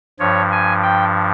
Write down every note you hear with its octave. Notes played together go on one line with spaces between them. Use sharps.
G2 F3 C#5
G#5
G5